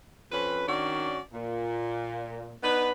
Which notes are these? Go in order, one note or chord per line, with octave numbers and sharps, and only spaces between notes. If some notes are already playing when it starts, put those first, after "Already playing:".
F2 C4 C#4 B4
D#3 C#4 D4 F#4 D5
A#2
B3 D4 D#4 B4